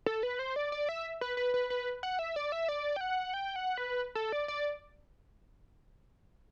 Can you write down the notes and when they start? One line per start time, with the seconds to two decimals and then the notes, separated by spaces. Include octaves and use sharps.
0.06 A4
0.23 B4
0.39 C5
0.56 D5
0.72 D5
0.89 E5
1.21 B4
1.37 B4
1.54 B4
1.70 B4
2.03 F#5
2.19 E5
2.36 D5
2.52 E5
2.68 D5
2.96 G5
3.01 F#5
3.34 G5
3.56 F#5
3.77 B4
4.15 A4
4.32 D5
4.48 D5